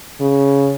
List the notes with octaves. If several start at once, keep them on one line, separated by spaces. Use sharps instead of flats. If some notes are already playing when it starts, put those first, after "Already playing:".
C#3